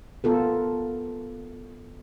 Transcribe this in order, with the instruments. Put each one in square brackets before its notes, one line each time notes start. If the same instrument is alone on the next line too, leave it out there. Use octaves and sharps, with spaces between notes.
[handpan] B3 F4 A4 A#4